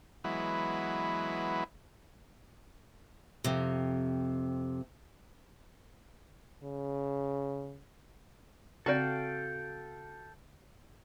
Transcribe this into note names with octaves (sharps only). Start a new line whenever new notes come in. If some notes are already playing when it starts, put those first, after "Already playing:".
E3 F#3 G#3 B3 E4
F2 C3
C#3
C#3 C4 F#4 A4 D5 F5 G5